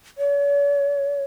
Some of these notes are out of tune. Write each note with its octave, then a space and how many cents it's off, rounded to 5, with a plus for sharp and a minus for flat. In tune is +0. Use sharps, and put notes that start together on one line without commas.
C#5 +45